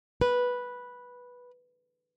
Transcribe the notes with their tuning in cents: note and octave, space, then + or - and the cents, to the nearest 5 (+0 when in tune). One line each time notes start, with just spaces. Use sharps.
B4 -5